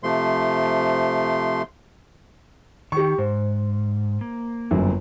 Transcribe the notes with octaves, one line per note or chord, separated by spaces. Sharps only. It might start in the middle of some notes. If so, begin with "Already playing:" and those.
C3 F3 A3 C6
D#3 G4 C#6
G#2 C5
A#3
G1 F#2